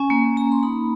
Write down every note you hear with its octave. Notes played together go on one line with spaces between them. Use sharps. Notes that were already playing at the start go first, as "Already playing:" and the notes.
Already playing: C#4 G#5
A#3
A#3 A#5
C6
D#4 B5